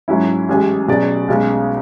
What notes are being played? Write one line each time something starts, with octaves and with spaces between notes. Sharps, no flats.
G#2 F#3 C#4 E4
A1 A2 G#3 C#4 G#4
B2 F#3 C#4 G#4 D5
B1 B2 G#3 C#4